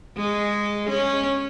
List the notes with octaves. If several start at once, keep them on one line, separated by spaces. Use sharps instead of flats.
G#3
C#4